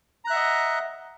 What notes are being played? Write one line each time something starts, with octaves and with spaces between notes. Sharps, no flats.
D#5 E5 F#5 A#5 F#6